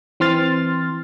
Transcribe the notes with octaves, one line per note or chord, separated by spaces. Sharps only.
E3 C4 C6 F6 A6